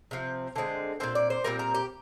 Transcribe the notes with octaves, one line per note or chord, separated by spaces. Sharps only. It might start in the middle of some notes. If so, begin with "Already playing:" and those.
C3 F3 C4
D3 G#3 C4
A#2 F3 C4 C5
D5
C5
A#2 G3 C4 A#4
A#4
G4